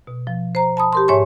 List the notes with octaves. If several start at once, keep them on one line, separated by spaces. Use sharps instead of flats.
B2
F3
C5 A#5
A5 B5 D#6
G4 A#4 C6
G#2 C#5 E5 G#5 C#6